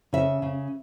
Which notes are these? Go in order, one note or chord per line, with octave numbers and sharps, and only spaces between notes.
C#3 E5
C#3